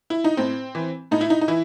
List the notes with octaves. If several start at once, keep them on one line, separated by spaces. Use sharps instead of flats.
E4
D#4
A2 C4
E3
A2 D#4
E4
D#4
D#4
E3 E4